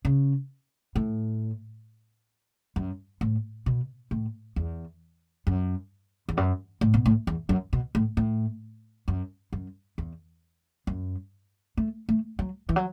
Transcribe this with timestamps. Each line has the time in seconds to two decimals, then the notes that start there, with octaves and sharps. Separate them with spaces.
0.05 C#3
0.96 A2
2.76 F#2
3.21 A2
3.66 B2
4.11 A2
4.56 E2
5.47 F#2
6.29 E2
6.37 F#2
6.81 A2
6.94 B2
7.06 A2
7.27 E2
7.49 F#2
7.73 B2
7.95 A2
8.17 A2
9.08 F#2
9.53 F#2
9.98 E2
10.87 F#2
11.77 A3
12.09 A3
12.39 F#3
12.69 E3
12.76 F#3